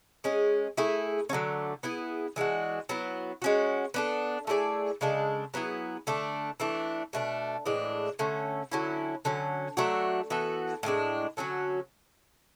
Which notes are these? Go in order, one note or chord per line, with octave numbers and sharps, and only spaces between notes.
G#3 C#4 G#4
A3 E4 G#4
D3 F#3 A3 C#4
B3 E4 G#4
E3 G#3 D4 F#4
F#3 B3 E4
G#3 C#4 F#4
B3 D4 A4
A3 E4 G#4 D5
C#3 G#3 D4 A4
F#3 B3 E4 G#4
D3 A3 D4
E3 A3 D4
B2 A3 D4
A2 E3 G#3 D4
D3 A3 C#4
D3 F#3 C#4 E4
D3 F#3 C#4
F#3 A3 D4 F#4
E3 B3 F#4 A4
A2 E3 G#3 D4
D3 F#3 C#4 F#4